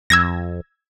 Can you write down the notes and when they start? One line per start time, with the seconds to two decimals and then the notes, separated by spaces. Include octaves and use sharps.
0.10 F2 E6 G#6 A#6